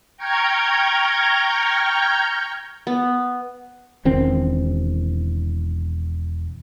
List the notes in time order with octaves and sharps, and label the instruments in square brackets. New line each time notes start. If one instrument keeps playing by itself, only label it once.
[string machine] G5 A#5 C#6 F6 G6 G#6
[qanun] B3
[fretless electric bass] E1 D#3 C4 C#4